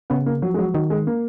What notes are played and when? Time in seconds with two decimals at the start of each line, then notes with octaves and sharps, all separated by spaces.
0.10 C#3 B3
0.26 A#3
0.42 F3 F#3
0.54 G#3
0.58 F#3
0.74 D#3 F#3
0.90 G#3
1.07 A#3